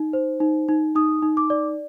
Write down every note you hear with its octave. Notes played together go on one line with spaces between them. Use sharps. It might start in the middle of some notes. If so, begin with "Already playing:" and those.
Already playing: D#4
C5
D#4
D#4
D#4 D#6
D#4
D6
D5